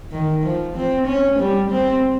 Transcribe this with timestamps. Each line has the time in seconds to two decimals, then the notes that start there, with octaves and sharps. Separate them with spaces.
0.12 D#3
0.43 F3
0.75 C4
1.07 C#4
1.39 G3
1.71 C4